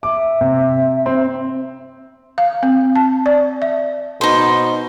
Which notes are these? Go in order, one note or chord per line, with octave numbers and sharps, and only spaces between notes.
E5 D6
C3
C4
F5
C4
A5
D5
E5
B2 D#4 C5